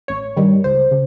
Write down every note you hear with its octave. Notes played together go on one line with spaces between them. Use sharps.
A1 C#5
G2 D#3 G3
C#2 C5
C#3